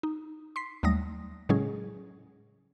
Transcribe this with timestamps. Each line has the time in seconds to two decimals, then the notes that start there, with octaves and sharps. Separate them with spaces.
0.03 D#4
0.56 C6 B6 C7
0.83 D#2 F#3 G3 A3 D#6 A#6
1.49 A2 C#3 F#3 G#3 C#4 G#4